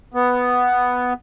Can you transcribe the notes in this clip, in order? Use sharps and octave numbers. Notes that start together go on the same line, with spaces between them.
B3